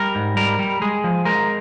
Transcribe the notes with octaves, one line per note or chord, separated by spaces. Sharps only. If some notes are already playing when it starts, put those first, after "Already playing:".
Already playing: G3 A#4
G#2
G3 A#4
G3
G#3 G#4
F3
G#3 A#4